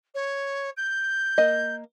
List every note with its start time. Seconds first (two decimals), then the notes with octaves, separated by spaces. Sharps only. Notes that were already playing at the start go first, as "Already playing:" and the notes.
0.14 C#5
0.77 G6
1.38 A#3 D#5